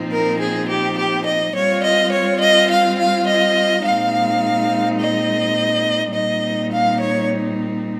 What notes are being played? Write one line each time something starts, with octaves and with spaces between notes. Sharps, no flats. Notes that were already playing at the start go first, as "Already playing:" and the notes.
Already playing: A#2 F3 C4 D#4
A#4
G#4
G4
G4
D#5
G3 C4 F4 C#5
D#5
C#5
D#5
F5
F5
D#5
A#2 G#3 C4 D#4 F5
D#5
A#2 G3 C4 D#4 D#5
F5
C#5